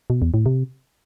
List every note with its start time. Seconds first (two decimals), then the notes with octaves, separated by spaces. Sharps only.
0.10 B2
0.22 E2
0.34 A2
0.46 C3